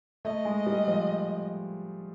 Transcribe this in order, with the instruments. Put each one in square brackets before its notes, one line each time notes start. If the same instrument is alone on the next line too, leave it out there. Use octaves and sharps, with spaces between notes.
[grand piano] A3 [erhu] D#5
[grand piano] G#3
G3
F3